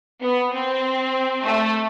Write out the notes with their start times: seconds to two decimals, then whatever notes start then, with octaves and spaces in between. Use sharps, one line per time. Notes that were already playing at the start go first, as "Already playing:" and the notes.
0.22 B3
0.53 C4
1.43 A3